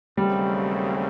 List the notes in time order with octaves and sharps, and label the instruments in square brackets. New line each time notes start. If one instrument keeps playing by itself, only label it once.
[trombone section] D#2 C#3 F#3 A3 C4 [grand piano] G3